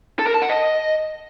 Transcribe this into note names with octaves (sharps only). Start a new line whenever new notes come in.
A4
A#4
A5
F#5
D#5